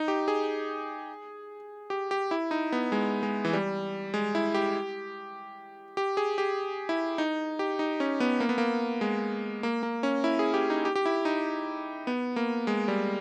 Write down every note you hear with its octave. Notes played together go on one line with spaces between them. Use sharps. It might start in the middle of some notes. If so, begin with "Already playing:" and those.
Already playing: D#4
G4
G#4
G4
G4
E4
D#4
B3
G#3
G#3
E3
G3
G#3
E4
G4
G4
G#4
G4
E4
D#4
G4
D#4
C#4
B3
A#3
B3
A#3
G#3
A#3
A#3
C#4
E4
G#4
G4
D#4
G4
G4
E4
D#4
B3
A#3
G#3
G3